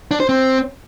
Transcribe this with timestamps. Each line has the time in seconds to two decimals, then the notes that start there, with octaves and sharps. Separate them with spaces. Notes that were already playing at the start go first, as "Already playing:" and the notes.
0.11 D4
0.20 C5
0.29 C4